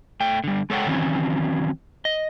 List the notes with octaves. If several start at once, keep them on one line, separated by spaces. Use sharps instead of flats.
A3 G5
D3 G3
G#3 A4 C#5 F#5 G5
D#3 E3 F#3 C4 C#4
D#5